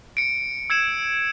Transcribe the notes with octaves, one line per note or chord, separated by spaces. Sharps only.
C#7 D7
E6 G#6 C#7 E7